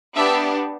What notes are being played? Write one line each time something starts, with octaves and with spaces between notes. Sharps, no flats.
B3 D4 G4 E5